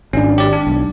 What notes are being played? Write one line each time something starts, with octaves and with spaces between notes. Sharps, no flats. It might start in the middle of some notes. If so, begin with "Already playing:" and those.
G#1 C#4 D4
G4 D5
D4
B1